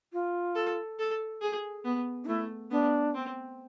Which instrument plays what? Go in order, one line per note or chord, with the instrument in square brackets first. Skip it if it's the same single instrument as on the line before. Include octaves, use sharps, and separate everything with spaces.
[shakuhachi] F4
[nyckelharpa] A4
A4
G#4
B3
[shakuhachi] D4
[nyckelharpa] A3 [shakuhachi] E4
[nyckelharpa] B3 [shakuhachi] D4
[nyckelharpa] C4